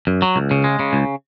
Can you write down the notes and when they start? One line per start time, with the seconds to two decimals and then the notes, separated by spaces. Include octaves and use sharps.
0.07 F#2
0.22 F#3
0.36 C#2
0.51 C#3
0.64 G#3
0.79 C#3
0.93 C#2